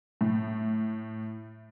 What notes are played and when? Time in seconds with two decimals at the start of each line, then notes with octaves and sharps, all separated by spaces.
0.21 A2